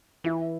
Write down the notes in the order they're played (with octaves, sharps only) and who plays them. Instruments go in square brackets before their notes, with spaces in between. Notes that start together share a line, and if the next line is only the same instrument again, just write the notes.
[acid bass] E3 [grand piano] E4